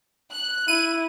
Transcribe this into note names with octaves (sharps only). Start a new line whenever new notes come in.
F#6
E4 D#7